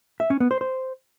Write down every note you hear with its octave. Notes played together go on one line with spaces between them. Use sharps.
E5
C#4
B3
C5
C5